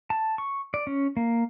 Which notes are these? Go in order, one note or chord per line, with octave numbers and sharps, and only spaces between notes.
A5
C#6
D5
C#4
A#3